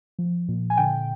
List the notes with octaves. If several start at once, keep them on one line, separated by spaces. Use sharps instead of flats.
F3
A#2
G#5
D3 G5